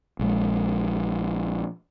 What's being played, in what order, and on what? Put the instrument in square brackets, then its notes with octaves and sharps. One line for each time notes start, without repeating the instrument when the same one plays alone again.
[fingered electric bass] A#1 G#3